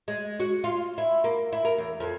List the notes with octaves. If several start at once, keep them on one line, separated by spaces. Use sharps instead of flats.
G#3
F#4
F4
E4
A#3
E4
A#4
E2
F2